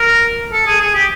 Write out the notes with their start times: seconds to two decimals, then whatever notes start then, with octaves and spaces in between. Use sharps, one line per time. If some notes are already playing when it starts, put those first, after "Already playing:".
Already playing: A#4
0.52 A4
0.67 G#4
0.80 G#4
0.94 G4